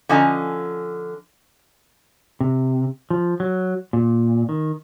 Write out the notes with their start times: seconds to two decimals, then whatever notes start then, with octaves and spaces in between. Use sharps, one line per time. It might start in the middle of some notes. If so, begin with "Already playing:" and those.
0.09 D3 F3 C#4 D#5 G#5 A#5
2.40 C3
3.10 F3
3.40 F#3
3.93 A#2
4.49 D#3